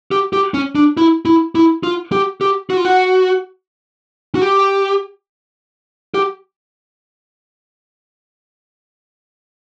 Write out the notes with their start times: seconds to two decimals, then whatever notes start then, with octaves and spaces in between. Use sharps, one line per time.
0.11 G4
0.33 G4
0.54 C#4
0.75 D4
0.97 E4
1.25 E4
1.55 E4
1.83 F4
2.12 G4
2.41 G4
2.70 F#4
2.77 F4
2.85 F#4
4.35 F#4
4.42 G4
6.14 G4